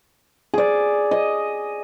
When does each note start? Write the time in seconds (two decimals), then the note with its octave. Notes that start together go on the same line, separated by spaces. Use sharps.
0.54 G#4 D5
1.11 D#5